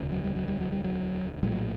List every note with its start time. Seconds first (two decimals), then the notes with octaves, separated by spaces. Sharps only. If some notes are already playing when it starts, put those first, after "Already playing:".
Already playing: E1 D2 C#3
0.12 F#3
0.24 G3
0.36 F#3
0.48 G3
0.60 F#3
0.72 G3
0.84 F#3
1.43 A#1 A2 G3
1.52 F#3